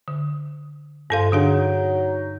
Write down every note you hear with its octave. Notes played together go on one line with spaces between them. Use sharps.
D3
G2 C3 G#3 A4 F5
D3 F#3 D4 D#4 G#4